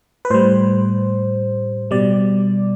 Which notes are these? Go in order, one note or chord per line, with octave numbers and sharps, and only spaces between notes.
B4
A2 G3 C5
B2 G3 D5